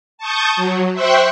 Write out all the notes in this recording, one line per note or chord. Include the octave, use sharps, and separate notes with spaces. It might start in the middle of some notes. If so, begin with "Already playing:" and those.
A5 C#6 D#6 G6
F#3
C5 E5 G5 C6 C#6 F#6